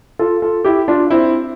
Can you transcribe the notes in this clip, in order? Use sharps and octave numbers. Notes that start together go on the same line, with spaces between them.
F4 A4
F4 A4
E4 G4
D4 F4
C4 E4